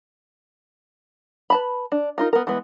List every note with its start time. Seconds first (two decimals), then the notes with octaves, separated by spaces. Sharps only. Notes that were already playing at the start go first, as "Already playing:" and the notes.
1.50 B4 A5 B5
1.92 D4
2.18 D#4 F4 A#4
2.33 B3 A#4
2.47 E3 G#3 B3